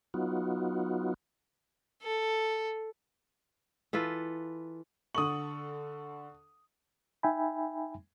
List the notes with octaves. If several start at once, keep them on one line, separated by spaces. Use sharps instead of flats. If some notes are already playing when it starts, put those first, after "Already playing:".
F#3 B3 D#4 F4 F#4
A4
E3 F4 A4 B4
D3 A4 C#6 D#6 F#7
D#4 E5 G5 G#5 B5